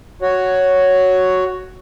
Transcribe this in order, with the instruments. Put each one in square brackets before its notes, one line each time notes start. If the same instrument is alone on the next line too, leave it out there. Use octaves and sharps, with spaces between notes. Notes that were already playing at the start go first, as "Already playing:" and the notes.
[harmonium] F#4 C#5